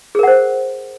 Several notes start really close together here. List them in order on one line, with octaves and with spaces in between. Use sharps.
G#4 A#4 F#5 C5